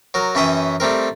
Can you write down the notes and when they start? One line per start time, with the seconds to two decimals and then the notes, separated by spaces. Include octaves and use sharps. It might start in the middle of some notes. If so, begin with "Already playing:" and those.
0.14 F#3 A#4
0.35 F#2 E3 C#4 E5 G5 D#6
0.80 G3 A3 C4 A#4